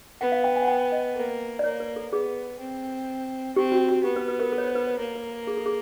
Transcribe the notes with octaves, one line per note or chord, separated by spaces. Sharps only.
B3 F#5
F5
G5
G#5
F#5
G5
D#5
A#3
D5
A#3 C#5
B4
A4
B3 G#4
C4
C4 G4
F#4
F#4
B3 G4
B4
B4
A#4
A4
C#5
C5
B4
C#5
A#3 C#5
B4
G#4
A4
G#4